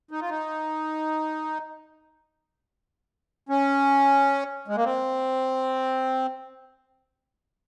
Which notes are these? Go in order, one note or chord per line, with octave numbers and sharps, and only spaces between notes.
D#4
F4
D#4
C#4
G#3
A#3
C4